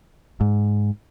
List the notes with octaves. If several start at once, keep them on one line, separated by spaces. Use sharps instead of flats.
G#2